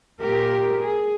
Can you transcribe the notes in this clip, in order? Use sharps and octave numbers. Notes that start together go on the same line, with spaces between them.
A#2 G4 A#4
G#4